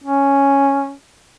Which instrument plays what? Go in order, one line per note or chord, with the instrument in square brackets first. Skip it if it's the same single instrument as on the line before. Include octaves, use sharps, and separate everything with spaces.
[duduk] C#4